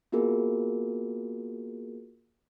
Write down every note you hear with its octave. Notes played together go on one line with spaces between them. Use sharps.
A#3 B3 F4 F#4 G#4 A#4